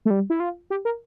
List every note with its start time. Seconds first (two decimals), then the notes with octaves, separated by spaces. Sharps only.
0.05 A3
0.10 G3
0.30 E4
0.40 F4
0.70 G4
0.85 A#4